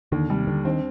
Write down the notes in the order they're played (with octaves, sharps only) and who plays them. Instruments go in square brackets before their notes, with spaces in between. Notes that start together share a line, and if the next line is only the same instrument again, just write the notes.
[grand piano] D#2 [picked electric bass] D3
[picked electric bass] C3 [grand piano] G3
[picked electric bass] D3 [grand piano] D4
[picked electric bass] D#3 [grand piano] C4